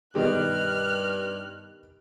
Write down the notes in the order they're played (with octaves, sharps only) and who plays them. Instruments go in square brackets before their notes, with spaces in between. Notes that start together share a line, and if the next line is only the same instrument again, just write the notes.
[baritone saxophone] G2 [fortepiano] B2 D#3 G4 [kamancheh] F6 F#6